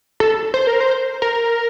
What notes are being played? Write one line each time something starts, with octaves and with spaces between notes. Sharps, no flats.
A4
C5
A#4
C5
A#4